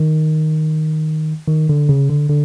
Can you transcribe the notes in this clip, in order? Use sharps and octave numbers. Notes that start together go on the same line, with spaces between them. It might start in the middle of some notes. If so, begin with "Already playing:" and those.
Already playing: D#3
D#3
D3
C#3
D3
D3